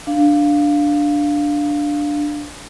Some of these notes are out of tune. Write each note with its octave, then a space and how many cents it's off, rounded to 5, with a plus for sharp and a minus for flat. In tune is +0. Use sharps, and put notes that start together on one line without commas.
D4 +0 F5 +0